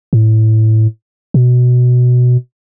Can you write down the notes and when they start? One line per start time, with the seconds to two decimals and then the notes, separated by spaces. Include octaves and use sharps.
0.13 A2
1.34 B2